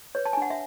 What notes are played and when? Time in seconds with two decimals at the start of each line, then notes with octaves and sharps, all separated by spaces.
0.15 B4 C#5
0.25 A5
0.33 G#5
0.37 D4 F#5
0.50 E5